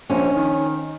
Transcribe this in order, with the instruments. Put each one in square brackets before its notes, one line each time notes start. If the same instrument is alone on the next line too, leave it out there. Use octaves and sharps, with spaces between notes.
[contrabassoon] A#1 [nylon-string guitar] C#4
[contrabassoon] D#3